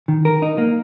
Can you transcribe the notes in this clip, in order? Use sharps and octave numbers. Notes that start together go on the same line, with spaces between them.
D#3
A#4
D#4
A#3